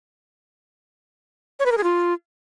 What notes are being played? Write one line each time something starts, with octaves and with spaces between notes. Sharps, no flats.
C#5
B4
A#4
G#4
F4